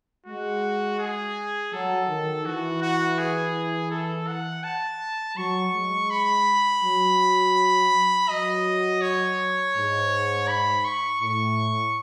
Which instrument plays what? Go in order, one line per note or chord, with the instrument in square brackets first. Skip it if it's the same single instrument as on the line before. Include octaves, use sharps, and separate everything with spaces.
[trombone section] G#3 [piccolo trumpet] F#4
[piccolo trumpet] G#4
[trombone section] F#3 [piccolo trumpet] A4
[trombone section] D#3
[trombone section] E3 [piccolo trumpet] F#4
[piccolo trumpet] F#4
G#4
A4
F#5
A5
[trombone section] F#3 [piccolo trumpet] C#6
[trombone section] G#3
[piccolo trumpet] B5
[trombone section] F#3
[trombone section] F#3 [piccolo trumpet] D#5
[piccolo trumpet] C#5
[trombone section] G#2
[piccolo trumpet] B5
C#6
[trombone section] A2 [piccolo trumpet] C#6